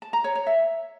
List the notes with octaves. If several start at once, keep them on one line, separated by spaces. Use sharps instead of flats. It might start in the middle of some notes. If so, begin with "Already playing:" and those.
A5
A#5
C#5
C#5
E5